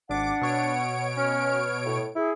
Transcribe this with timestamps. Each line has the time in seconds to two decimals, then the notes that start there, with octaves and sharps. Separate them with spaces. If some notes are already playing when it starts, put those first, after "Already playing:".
0.10 G#1 D4 F#5 D6
0.42 B2 C#5 D7
1.17 C#4 F6
1.86 A2
2.16 E4 G#4